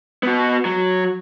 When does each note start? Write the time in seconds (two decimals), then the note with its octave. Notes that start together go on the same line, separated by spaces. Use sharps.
0.23 B3 F#4
0.65 F#3